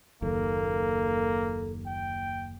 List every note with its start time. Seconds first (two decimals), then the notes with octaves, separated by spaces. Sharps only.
0.22 F#1 D#2 A#3 A4
1.86 G5